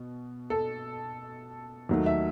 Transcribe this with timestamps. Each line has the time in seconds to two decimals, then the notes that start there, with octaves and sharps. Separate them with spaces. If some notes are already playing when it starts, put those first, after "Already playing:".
Already playing: B2
0.50 A4
1.89 D#2 D#3 F#3 A3
2.06 E5